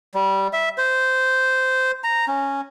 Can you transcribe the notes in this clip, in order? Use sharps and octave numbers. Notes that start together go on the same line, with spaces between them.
G3
E5
C5
A#5
C#4